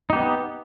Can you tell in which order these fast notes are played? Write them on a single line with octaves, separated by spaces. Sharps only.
D#4 G4 B3